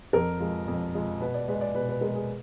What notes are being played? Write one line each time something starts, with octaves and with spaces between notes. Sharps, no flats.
F2 A#4
F3 G#3
F2
F3 G#3
B2 B4
D5
G#3 B4
D5
B2 B4
B4
G#3 A#4
G#4